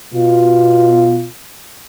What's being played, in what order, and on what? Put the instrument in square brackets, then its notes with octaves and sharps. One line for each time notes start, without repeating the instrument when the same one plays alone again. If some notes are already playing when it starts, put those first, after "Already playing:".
[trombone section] B2 F4